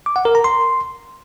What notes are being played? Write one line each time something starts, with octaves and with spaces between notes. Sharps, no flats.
D6
F#5
A#4
A#5
C6